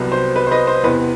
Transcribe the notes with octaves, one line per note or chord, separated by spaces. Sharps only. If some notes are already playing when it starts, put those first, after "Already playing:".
Already playing: C2 C3 F#3 B3
C5
B4
C5
B4 D#5
C5
E2 C3 E3 B3 B4